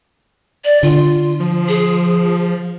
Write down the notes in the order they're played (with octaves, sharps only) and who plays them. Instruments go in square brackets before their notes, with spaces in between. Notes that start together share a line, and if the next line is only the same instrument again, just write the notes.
[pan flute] D5
[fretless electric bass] D3 [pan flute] F4
[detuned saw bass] F3
[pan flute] G#4